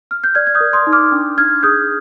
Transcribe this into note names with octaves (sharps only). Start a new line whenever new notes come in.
F6
G6
D5 F6 G#6
G#6
D#6 G6
A#4
C6 D#6
D#4
D6 F6
D4
D4 F6 G#6
G#4 D#6 G6